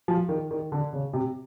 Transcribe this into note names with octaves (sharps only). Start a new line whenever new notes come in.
F3
D#3
D#3
D3
C#3
C3